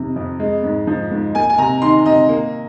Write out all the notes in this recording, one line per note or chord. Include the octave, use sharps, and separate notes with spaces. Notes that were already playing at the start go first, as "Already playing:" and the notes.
Already playing: F2 C3 D#3
F2
G#3
G#2
F3
G#2
A#3 G#5
G#5
C3 A#5
D#3 C6
C3 D#5
A#3